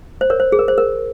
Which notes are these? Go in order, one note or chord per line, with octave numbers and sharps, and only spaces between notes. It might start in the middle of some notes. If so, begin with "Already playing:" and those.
C5
A#4 C#5
C5
G#4
A#4
C5
A#4